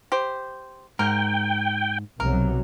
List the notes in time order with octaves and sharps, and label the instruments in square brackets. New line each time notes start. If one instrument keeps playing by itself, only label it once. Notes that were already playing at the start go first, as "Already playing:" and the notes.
[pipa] G4 C5
[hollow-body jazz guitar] G#2 [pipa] A#4 [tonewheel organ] G5
[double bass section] B1 C3 F#3 [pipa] A#4